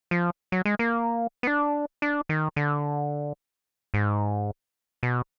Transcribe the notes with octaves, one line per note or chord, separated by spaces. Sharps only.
F3
F#3
G#3
A#3
B3
D4
D4
D#3
D3
G#2
B2